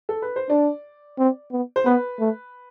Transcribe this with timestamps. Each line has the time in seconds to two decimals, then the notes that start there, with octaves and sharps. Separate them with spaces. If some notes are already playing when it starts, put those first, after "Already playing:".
0.09 A4
0.22 B4
0.36 C5
0.50 D4 D5
1.18 C4
1.52 B3
1.76 C5
1.85 B3 B4
2.19 A3